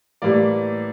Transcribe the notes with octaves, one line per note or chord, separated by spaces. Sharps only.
A2 E3 G3 A#3 D5